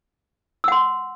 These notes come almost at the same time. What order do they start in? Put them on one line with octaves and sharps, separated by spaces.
E6 F#5 C6